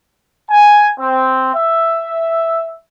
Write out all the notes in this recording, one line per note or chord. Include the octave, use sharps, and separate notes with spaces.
G#5
C4
E5